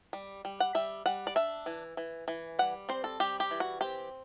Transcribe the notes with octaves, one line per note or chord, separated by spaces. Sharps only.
G3
G3
F#5
G3 E5
G3 F#5
D5
D4 E5
E3
E3
E3
G3 F#5
C4 C5
A4
G3 G4
G4
E3
F#4
C4 G4